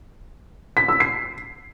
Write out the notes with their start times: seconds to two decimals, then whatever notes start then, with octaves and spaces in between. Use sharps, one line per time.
0.77 B6
0.88 E6
1.00 C7